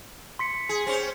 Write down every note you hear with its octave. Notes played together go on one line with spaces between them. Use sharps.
C6 B6 C#7
G#4
C4 C#4 C5